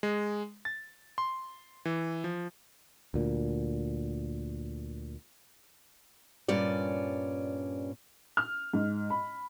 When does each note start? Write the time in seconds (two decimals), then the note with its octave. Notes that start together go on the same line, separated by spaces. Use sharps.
0.03 G#3
0.65 A6
1.18 C6
1.85 E3
2.24 F3
3.14 D2 A#2
6.48 G2 A#2 C#4 D5
8.37 F6
8.73 G#2
9.10 B5